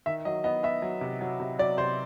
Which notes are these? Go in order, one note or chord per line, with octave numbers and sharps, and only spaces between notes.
D#3 E5
F#3 D#5
B3 D#5
B3 E5
F#3
C3
F#3
C3
F#3 D5
C3 C5